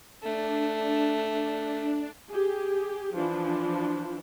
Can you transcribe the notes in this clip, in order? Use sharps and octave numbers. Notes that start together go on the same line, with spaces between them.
A3 D4
G4 G#4
E3 F3 D4